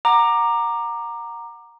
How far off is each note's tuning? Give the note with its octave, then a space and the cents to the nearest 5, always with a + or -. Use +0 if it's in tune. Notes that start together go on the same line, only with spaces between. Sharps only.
F#5 +0 A#5 +0 D6 +20